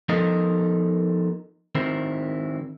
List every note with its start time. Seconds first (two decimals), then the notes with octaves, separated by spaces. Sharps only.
0.09 F3 B3 D#4 A4 A#4 D#5
1.75 D#3 C4 E4 A#4